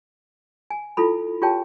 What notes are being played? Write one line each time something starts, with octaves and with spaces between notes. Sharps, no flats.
G#5
E4 F4 A4 B5
F4 G4 G#4 C#5 G5 A5